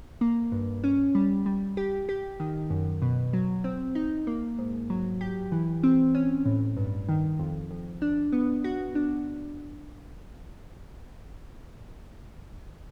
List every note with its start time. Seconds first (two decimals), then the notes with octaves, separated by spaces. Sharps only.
0.21 A#3
0.52 G2
0.84 C#4
1.15 G3
1.46 G3
1.77 G4
2.09 G4
2.40 D#3
2.70 F#2
3.02 B2
3.33 F#3
3.64 C4
3.95 D#4
4.27 A#3
4.58 G#2
4.90 F#3
5.21 G4
5.52 E3
5.83 C4
6.15 C#4
6.46 A2
6.77 G2
7.09 D#3
7.39 F2
7.71 F2
8.02 D4
8.32 B3
8.64 F#4
8.95 D4